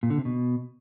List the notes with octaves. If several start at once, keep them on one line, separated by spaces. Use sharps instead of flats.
A#2
D3
C3
B2